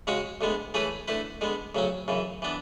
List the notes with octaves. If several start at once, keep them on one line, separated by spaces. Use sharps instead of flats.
C#3 G#3 C#4 F#4 C#5
D2 D3 G#3 B3
E3 A3 C#4 G#4 B4
D3 A3 E4 B4
D3 G#3 B3
D2 C#3 F#3 C#4
F#2 C#3 E3
E3 B3 D4